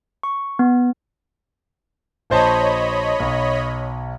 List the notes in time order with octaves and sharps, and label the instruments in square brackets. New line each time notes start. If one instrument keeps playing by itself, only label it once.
[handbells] C#6
B3
[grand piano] A#1 C5 A5 [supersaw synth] C#5 D#5 B5
[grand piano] B1